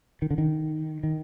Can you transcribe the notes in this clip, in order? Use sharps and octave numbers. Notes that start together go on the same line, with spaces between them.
D#3
D3
D#3
D#3